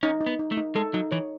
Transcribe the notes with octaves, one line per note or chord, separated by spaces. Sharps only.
C#4 D#4
D#4
B3
D#4
A3
D#4
G#3 A4
F#3 D#4
E3 C#5